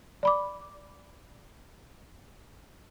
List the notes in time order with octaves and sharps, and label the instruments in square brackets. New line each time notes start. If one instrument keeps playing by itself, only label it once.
[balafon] D5 B5 D6